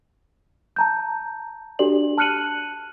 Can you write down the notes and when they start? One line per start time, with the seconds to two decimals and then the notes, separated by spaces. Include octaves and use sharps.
0.76 A5 A#5 G6
1.79 D4 F#4 G4 A4 D5 F#7
2.18 A5 F6 F#6 C#7 D#7 F#7